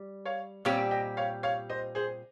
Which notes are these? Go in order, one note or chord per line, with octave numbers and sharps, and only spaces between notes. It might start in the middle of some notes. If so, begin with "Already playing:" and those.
Already playing: G3
C#5 F5
A#2 G3 C4 G4 C#5 F5
D#5 G5
C#5 F5
C#5 F5
C5 D#5
G#4 C5